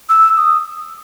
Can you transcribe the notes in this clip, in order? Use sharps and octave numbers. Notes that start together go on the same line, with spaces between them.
E6
D#6